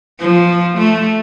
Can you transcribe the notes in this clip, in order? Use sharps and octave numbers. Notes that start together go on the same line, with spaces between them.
F3
A3